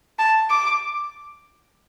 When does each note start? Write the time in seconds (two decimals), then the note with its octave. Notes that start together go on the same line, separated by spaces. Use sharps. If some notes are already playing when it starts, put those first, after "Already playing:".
0.19 A5
0.50 D6